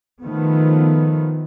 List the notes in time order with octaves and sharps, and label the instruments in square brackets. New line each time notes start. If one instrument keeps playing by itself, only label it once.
[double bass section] D#3 F3 A3 B3